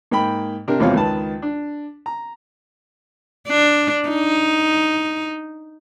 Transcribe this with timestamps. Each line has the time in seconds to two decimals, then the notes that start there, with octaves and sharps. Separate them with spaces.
0.11 G#2 A#3 G5 B5
0.68 C3 D4 G4 A#4
0.80 G#1 E2 C3 F3 C#5 F5
0.94 C#2 D#3 B4 A5
1.42 D4
2.06 A#5
3.48 D4
4.09 D#4